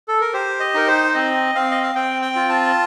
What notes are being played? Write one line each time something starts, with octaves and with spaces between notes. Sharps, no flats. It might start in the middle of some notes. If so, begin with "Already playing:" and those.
A4
A#4
G4 C5
D#5
D#4 A#4
C5
C4 D#5
C4 F5
D#5
F5
C4 G5
G5
F4
A5